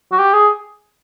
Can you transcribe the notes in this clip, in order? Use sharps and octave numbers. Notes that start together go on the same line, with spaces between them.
F#4
G4
G#4